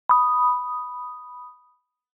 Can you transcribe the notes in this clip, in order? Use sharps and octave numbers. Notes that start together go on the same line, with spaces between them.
B5 D#6